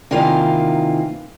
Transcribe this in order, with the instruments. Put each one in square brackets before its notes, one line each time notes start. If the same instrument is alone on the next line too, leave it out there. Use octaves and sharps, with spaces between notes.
[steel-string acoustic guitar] C3 D#3 E3 A#3 F4 F5